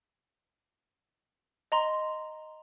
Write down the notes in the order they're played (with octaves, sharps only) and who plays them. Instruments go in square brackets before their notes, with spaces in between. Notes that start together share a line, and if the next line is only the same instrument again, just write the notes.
[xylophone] D#5 A#5 C6